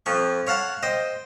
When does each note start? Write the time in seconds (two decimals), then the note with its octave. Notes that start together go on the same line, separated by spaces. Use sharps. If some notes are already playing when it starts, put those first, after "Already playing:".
0.06 F2 F3 C#6
0.47 C#5 F5 F#5 A5
0.83 C5 D#5 G5